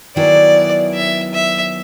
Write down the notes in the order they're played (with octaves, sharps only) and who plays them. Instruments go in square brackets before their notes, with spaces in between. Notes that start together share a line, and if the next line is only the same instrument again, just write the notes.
[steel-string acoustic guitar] D#3 F#3 B3 E4 G#4 [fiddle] D5
[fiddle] E5
E5